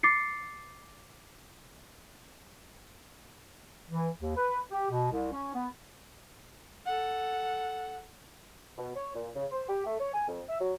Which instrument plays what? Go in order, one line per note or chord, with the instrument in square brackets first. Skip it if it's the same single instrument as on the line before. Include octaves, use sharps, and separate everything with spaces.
[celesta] D6 A6 C7 C#7
[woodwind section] E3
D#2
B4
G4
B2
C2
C#4
B3
[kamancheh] A4 F#5
[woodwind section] B2
C#5
A#2
C#3
C5
G4
A3
C#5
G#5
F2
E5
F#3